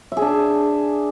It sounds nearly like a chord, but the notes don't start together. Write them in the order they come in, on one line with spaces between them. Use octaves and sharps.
E5 G#4 D4